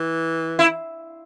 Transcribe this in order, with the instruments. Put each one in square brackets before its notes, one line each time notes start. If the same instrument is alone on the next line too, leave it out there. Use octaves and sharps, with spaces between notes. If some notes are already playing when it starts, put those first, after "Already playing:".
Already playing: [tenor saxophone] E3
[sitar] E4